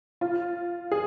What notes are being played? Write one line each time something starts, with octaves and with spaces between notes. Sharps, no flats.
F4
G#4